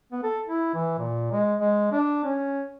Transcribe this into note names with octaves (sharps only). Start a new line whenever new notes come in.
B3
A4
E4
E3
A#2
G#3
G#3
D4
C#4